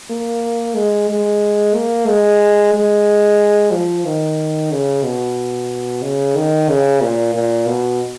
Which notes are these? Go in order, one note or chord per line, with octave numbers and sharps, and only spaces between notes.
A#3
G#3
G#3
A#3
G#3
G#3
F3
D#3
C#3
B2
C#3
D#3
C#3
A#2
A#2
B2